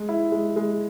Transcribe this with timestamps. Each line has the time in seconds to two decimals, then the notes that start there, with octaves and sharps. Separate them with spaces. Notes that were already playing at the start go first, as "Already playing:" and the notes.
Already playing: G#3
0.09 E4
0.32 G#3
0.56 G#3